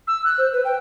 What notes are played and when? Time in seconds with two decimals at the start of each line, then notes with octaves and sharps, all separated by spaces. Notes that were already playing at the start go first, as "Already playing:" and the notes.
0.07 E6
0.25 F#6
0.38 C5
0.53 B4
0.65 G5